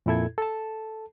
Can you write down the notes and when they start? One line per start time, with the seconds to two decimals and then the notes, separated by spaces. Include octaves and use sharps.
0.06 F2 A#2 E4 A4 G#6
0.38 A4 A5